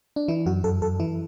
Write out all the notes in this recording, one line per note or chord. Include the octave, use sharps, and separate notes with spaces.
D4
E3 E4
F#2 F#4
F#2 A4
F#2 A4
E3 E4